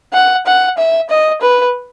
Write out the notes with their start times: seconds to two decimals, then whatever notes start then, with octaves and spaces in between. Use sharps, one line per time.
0.14 F#5
0.46 F#5
0.78 E5
1.10 D#5
1.41 B4